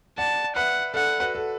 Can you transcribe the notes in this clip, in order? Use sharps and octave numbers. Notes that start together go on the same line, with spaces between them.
D5 F#5 A5
B4 E5 F#5
A4 D5 F#5
F#4 B4
A4